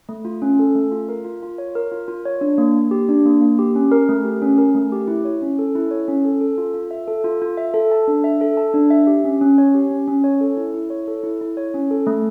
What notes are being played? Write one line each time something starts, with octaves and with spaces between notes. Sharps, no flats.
A3
F4
C#4
A4
A3
F4
A#4
F4
F4
C#5
A#4
F4
F4
C#5
D4
A#3
A#3
G4
D4
A#3
A#3
G4
C#4
A#4
A3
G4
C#4
A#4
A3
G4
E4
C#5
C#4
A4
E4
C#5
C#4
A4
A4
F4
F4
E5
A4
F4
F4
E5
A4
A5
D4
E5
A4
A5
D4
E5
G4
C#4
C#4
C#5
G4
C#4
C#4
C#5
A4
E4
E4
C#5
A4
E4
E4
C#5
C#4
A4
A3